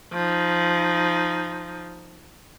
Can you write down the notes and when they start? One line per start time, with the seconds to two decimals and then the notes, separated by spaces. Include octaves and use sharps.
0.13 F3 D#4